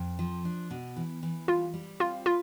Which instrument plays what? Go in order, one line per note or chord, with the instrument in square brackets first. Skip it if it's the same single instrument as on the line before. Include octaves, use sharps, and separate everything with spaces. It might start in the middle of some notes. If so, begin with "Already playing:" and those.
Already playing: [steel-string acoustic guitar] F2
F3
D4
B2
E3
E3
[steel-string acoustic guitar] G3 [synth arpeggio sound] F4
[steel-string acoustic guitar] G3
[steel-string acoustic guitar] C4 [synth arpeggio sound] F4
[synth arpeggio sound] F4 [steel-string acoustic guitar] B4